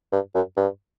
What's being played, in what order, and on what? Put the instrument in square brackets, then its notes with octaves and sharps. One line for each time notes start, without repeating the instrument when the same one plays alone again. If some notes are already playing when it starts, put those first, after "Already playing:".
[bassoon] G2
F#2
G2